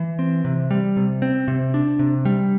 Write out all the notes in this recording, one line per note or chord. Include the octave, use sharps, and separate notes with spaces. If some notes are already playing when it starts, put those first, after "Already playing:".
Already playing: E3
C4
C3
G3
C3
C4
C3
D4
C3
G3